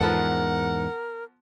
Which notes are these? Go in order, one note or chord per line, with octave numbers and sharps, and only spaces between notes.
E2 G#2 F3 B3 A4 A#4 F#5